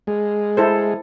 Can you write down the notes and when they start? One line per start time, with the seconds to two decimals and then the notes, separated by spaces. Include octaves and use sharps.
0.07 G#3
0.57 E4 A4 C5